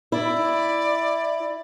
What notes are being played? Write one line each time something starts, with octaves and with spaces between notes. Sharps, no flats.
E4 D5